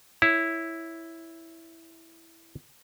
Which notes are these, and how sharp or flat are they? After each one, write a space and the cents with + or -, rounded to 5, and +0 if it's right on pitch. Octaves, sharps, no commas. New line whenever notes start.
E4 +0 C#5 +0